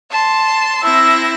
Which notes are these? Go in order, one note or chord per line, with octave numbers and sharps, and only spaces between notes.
A5 C6
C4 E4 E6 A#6